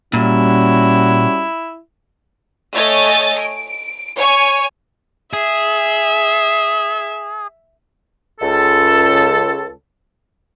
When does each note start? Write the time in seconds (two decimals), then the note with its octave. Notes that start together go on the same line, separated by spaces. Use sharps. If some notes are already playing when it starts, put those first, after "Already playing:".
0.13 A#2 G3 C#4 E4 F#4
2.74 A3 C#5 D#5 G#5 A6
3.39 D7
4.16 C#5 G#5 C#6
5.33 G#4 E5
8.41 C#2 A4